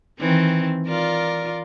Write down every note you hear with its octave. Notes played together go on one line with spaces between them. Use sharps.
D#3 E3 C4
F4 A#4 D5